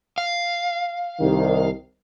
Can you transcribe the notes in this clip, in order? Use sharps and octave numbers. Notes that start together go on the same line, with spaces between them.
F5
C2 D#3